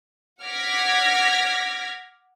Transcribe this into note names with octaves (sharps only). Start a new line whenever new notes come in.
F#5 D6 F6 G#6 A#6 B6